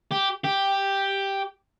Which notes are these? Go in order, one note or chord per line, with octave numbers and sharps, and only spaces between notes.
G4
G4